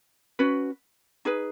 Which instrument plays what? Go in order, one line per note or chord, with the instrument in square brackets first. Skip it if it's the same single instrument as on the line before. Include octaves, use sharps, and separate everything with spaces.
[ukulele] C#4 F#4 B4
D#4 G#4 B4